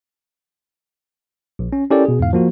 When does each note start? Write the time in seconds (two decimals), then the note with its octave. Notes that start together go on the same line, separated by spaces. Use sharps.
1.59 A#1
1.73 C#4
1.90 C#4 E4 G4 A4 A#4 D5
2.05 B2 G#4
2.19 E2 G#2 F5
2.33 F3 A#3 F#4